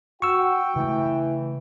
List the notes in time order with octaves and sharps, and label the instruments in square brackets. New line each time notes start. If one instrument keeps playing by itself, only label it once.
[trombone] F#4 [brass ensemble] G5 [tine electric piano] C#6 E6
[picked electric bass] C#3 A3 [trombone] E3